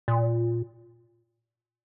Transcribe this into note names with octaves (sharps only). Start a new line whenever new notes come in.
A#2